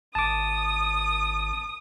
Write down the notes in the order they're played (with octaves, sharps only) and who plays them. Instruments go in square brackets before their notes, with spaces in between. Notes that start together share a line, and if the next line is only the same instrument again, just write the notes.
[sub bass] G#1 [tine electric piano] A5 D6 [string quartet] D#6